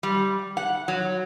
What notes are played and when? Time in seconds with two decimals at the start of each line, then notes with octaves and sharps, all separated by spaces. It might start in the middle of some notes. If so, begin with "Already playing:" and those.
0.03 G3
0.57 F#5
0.88 F#3